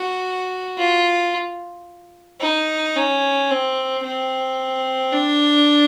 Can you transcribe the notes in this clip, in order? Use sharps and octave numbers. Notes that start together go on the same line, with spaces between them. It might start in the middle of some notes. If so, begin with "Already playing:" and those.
Already playing: F#4
F4
D#4
C#4
C4
C4
D4